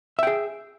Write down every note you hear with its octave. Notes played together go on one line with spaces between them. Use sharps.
G#4 E5 G5